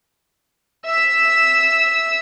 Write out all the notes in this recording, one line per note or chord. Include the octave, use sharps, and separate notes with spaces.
E5 E6